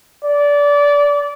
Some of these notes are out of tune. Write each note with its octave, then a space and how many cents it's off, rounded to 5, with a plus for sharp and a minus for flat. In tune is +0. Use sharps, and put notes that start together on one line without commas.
D5 -20